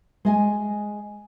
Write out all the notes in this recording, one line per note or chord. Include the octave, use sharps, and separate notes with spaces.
G#3 D#5 G#5